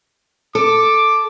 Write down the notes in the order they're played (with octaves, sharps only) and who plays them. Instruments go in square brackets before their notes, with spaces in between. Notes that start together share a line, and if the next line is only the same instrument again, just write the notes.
[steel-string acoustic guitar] A4 [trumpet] D6